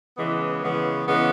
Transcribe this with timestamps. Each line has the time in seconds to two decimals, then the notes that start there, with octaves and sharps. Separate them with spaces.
0.18 C#3 E3 G#3 B3
0.62 C#3 E3 G#3 B3
1.08 C#3 E3 G#3 B3